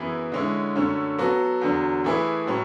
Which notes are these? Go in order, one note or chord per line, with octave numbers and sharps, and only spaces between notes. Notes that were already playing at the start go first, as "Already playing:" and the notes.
Already playing: F#2 E3 B3 E4 G#4
D3 G#3 C#4 E4
F#2 D3 A3 C#4
F#3 B3 F#4 A4
E2 D3 F#3
E3 A3 E4 G#4 B4
A2 F#3 C#4